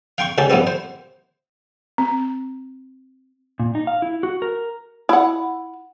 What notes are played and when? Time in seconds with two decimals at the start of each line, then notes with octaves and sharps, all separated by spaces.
0.18 F5 G5 C6 C#6
0.38 C#2 C#3 C#4 G4 A5
0.50 A2 F3 G3 B3 C4
0.67 C5
1.98 C4
3.60 A#2
3.75 D#4
3.87 F5
4.02 E4
4.23 F#4
4.42 A#4
5.09 E4 F#5